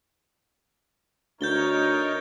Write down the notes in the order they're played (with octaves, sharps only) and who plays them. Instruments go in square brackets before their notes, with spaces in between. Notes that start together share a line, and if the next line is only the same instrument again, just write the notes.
[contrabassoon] D2 [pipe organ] D#4 A#4 C#5 [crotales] G6 A6 G7